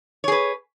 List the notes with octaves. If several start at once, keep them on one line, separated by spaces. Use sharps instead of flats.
G#4 B4 C#5